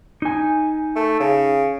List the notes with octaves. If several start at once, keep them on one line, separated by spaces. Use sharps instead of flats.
D#4 G#5
A3
C#3